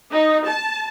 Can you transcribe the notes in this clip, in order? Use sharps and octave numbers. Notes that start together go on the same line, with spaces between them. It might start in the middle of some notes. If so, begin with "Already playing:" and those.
D#4
A5